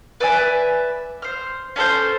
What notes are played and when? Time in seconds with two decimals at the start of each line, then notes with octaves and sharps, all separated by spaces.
0.20 B4 D5 E5 G#5
1.22 C5 F6
1.76 C#4 D4 A4 C5